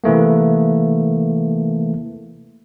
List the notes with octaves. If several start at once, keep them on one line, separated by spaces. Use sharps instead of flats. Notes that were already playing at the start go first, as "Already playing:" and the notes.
C3 E3 A3 A#3